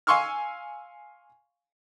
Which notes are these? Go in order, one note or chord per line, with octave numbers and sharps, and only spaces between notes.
F5 G#5 C6 C#6 E6 F6